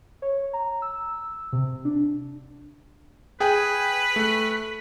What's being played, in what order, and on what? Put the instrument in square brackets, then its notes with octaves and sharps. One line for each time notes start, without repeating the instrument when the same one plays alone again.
[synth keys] C#5
A#5
E6
C3
D4
[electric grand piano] G#4 G5 G#5 [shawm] B4
[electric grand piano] A3